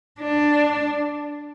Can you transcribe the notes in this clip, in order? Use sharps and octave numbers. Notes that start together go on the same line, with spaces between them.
D4